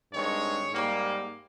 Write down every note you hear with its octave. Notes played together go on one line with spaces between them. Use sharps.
G2 D#3 G#3 C4 C#5
G#2 G3 A#3